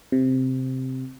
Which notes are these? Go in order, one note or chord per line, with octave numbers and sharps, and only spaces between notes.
C3